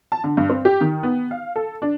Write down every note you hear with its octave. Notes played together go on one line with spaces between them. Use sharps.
A5
D3
G2
C4
G4
D#3
B3
F5
A4
D4